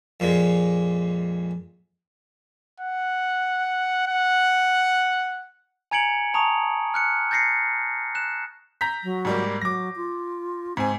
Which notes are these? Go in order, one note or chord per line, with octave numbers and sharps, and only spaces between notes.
F2 A#2 G#3
F#5
F#5
G#5 A#5 G#6 C#7 D7 F#7
A5 A#5 C#6 D#6
F6 F#6 C#7
G6 A6 A#6 C7 C#7
F#6 E7
A#5 G6 B6
F#3
G#2 G3 A#3
F#3 D6 A#6
F4
G#2 C4 G#5